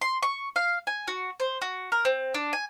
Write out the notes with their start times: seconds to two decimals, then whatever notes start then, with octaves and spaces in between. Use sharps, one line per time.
0.01 C6
0.22 C#6
0.56 F5
0.87 G#5
1.08 F#4
1.40 C5
1.62 F#4
1.92 A#4
2.05 C4
2.34 D4
2.53 G#5